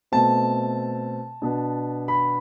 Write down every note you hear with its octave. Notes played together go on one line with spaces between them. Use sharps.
B2 A3 C4 A5
B2 B3 D4
B5